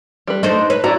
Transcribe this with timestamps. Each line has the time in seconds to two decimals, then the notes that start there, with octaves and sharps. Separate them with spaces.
0.27 G3 B4
0.43 A3 D4 D#4 C5
0.70 B4 C#5
0.84 E4 F#4 D5 A#5